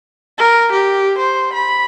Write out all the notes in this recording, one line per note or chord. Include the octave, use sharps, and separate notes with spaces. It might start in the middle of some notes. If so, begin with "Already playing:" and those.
A#4
G4
C5
B5